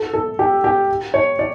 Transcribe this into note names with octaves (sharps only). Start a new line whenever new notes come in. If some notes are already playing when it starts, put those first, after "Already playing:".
Already playing: A4
A4
G4
G4
C#5
D5